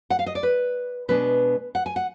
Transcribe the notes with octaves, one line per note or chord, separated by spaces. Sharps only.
F#5
F5
D#5
D5
B4
B2 G#3 B3 D4 B4
F#5
G#5
F#5